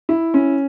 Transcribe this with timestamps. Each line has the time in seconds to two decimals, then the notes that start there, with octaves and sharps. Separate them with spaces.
0.09 E4
0.34 C#4